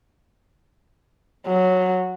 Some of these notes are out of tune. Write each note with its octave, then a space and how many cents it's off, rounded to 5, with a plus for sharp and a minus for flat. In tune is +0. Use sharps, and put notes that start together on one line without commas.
F#3 -10